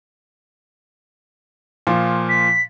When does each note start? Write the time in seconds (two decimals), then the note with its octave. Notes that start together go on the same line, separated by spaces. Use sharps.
1.87 A#2 F3
2.29 B6